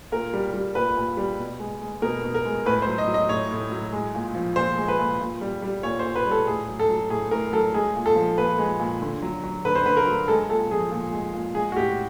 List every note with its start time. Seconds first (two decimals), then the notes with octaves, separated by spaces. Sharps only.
0.12 A#2 A#4
0.34 G3
0.54 G3
0.75 A#2 B4
0.97 A#2
1.17 G3
1.39 B2
1.59 G#3
1.81 G#3
2.02 B2 A#4
2.24 B2
2.34 A#4
2.45 G#3
2.66 A2 B4
2.82 C5
2.87 F#3
2.98 D#5
3.08 F#3
3.14 D#5
3.29 A2 C#5
3.51 A2
3.71 F#3
3.92 G#3
4.15 A#2
4.35 F3
4.56 A#2 C5
4.78 G#3
4.88 B4
4.99 A#2
5.20 A#2
5.41 G3
5.62 G3
5.83 A#2 C#5
5.99 C5
6.05 A#2
6.16 B4
6.26 G3
6.31 A4
6.47 A2 G#4
6.69 F#3
6.80 A4
6.90 F#3
7.10 A2 G#4
7.31 A2 A#4
7.53 F#3 A4
7.74 G#3 G#4
7.96 A#2
8.06 A4
8.16 F3
8.38 A#2 B4
8.58 G#3
8.79 A#2
9.01 D3
9.22 F#3
9.43 F#3
9.65 D3 B4
9.75 C5
9.85 D3 B4
9.97 A#4
10.07 F#3
10.28 G#3 A4
10.49 A#2 A4
10.71 F3 G#4
10.91 A#2
11.12 G#3
11.34 A#2
11.55 G#3 G#4
11.72 F#4
11.76 A2 G4